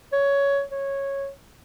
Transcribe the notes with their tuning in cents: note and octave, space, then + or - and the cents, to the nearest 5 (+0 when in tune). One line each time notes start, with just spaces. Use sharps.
C#5 +15
C#5 -10